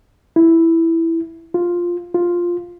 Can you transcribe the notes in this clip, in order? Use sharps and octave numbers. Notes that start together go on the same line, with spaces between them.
E4
F4
F4